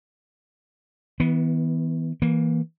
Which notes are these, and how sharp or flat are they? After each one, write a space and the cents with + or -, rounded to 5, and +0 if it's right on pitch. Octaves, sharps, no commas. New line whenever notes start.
E3 -35 B3 +0
E3 -10 A#3 +10